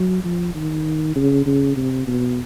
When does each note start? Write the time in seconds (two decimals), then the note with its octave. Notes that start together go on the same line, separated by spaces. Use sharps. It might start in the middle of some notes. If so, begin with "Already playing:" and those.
Already playing: F#3
0.24 F3
0.55 D#3
1.16 C#3
1.46 C#3
1.77 C3
2.07 B2